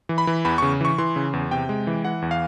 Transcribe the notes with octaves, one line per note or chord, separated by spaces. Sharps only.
E3
B5
E3
E2 B5
C#3 C#6
E3 C#6
E3 C6
C#3
E2
C3 G5
G#3
E3
E3 F#5
E2
F5